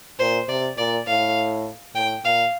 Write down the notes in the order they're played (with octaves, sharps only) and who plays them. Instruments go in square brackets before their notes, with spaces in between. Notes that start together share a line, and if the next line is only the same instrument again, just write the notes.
[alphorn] A#2 [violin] C5
[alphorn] C3 [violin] D5
[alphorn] A#2 [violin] D5
[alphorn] A2 [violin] F5
[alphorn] A2 [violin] G5
[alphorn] A#2 [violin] F5